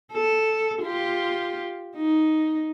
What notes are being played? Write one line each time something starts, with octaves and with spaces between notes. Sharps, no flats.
A4
F4 G4
D#4